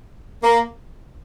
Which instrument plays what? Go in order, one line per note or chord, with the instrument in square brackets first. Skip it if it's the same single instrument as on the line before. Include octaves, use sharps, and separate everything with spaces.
[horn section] A#3